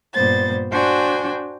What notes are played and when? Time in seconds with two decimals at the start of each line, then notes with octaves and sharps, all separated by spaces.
0.13 G2 A#2 B3 C5 A6
0.71 D4 F#4 C5 G5 G#5